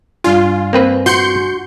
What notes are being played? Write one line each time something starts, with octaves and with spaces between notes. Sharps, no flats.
G2 D4 F4 G#5
A#3 C4 B4
F#4 C6 G6 C#7